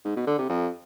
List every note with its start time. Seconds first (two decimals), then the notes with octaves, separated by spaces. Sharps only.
0.05 G#2
0.16 B2
0.27 D3
0.38 C3
0.49 F2